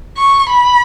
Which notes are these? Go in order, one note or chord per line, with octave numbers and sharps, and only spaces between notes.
C#6
B5